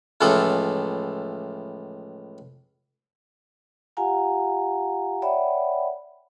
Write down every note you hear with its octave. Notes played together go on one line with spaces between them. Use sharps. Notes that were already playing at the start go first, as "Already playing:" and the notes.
C#2 A2 E3 F3 A4
F4 G4 F5 F#5 G#5 A#5
C#5 D5 E5 F#5 G5 B5